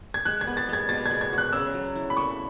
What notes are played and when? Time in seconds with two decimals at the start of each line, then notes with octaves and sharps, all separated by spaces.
0.14 G#6
0.25 G#3 F#6
0.41 G#6
0.47 B3
0.57 A6
0.69 G#3 G#6
0.89 B2 A6
1.06 G#6
1.11 G#3
1.21 G#6
1.32 F#4
1.38 F#6
1.53 C#3 E6
1.74 F#3
1.95 E4
2.10 B5
2.17 A3 C#6